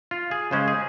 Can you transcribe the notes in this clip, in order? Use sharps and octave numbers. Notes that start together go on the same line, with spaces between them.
F4
G#4
C#3 G#3 C#4 C5
G#4